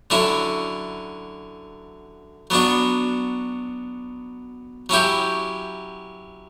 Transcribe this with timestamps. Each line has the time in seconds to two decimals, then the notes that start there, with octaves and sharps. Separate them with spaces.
0.10 D3 F#3 C#4 E4
2.50 F#3 B3 D4 F#4
4.89 F#3 C#4 E4 G4